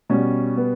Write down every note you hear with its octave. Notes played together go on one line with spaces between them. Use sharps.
B2 G3 C#4
B3